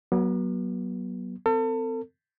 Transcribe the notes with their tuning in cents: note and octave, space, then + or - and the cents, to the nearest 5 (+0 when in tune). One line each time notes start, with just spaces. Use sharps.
F#3 +15 B3 -40
C4 -35 A4 +40